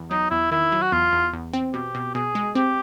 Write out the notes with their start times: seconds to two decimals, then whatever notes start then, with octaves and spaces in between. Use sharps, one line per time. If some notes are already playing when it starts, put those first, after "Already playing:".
Already playing: E2
0.11 F#3 D#4
0.31 E2 E4
0.51 D#3 E4
0.72 F#3
0.82 F#4
0.92 E2 F4
1.13 E2
1.33 E2
1.53 C4
1.73 B2 G4
1.95 B2
2.14 B2 G#4
2.35 G#3
2.55 C4 G4